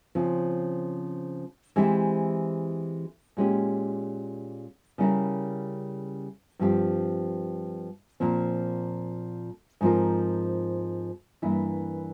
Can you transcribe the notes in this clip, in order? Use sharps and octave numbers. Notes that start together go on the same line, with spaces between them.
C#3 F3 C4
E3 G#3 C4 E4 G4
A#2 G#3 C#4 G4
C#3 G3 C#4 E4 A#4
G2 F3 C4 G4
A#2 F3 C4
G#2 F3 C4 F4 A#4
G2 E3 A#3 E4